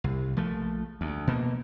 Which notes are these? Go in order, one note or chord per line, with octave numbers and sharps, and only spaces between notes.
C2
A#1 F3 A3
D2
B2 A#3